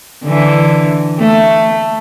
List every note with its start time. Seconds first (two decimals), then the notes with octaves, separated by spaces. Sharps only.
0.23 D3 E3
1.19 A3